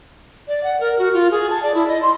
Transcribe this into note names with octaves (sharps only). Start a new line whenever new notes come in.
D5
F#5
A#4
F#4
F4
G#4
A5
D5
E4
D#5
C6